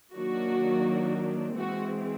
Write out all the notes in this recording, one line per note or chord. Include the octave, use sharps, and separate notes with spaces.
D#3 F#3 A#3 D4 F#4
E3 G#3 C4 F#4